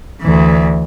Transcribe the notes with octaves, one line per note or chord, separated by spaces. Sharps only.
D2 E3